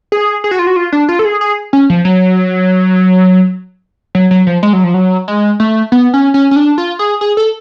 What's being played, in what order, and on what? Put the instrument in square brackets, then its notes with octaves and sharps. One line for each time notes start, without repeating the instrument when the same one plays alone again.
[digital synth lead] G#4
G#4
F#4
F4
F#4
F4
D4
F4
A4
G#4
G#4
C#4
F3
F#3
F#3
F#3
F3
G#3
F#3
F3
F#3
G#3
A3
B3
C#4
C#4
C#4
D4
F4
G#4
G#4
A4